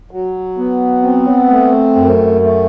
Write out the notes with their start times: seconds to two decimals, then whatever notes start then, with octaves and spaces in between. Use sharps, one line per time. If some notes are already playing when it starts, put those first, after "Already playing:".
0.11 F#3
0.58 B3
1.03 C4
1.50 A3
1.96 F#2
2.41 A3